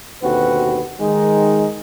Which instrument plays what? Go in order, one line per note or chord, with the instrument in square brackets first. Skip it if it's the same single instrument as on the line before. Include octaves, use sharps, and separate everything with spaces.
[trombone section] D#2 B2 D3 C4 F#4 B4
D#3 G#3 D#4